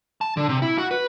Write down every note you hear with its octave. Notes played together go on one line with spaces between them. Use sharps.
A5
D3
C3
E4
F#4
B4